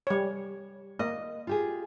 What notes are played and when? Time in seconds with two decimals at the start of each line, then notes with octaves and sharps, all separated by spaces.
0.07 G3 C#5
0.99 A#3 D#5
1.47 F4 G4 G#4